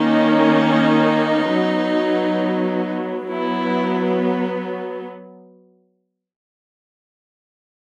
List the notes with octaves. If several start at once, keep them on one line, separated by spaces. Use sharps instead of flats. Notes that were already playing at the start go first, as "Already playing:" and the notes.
Already playing: D#3 A#3 C#4 D#4
F#3 B3
F#3 B3 E4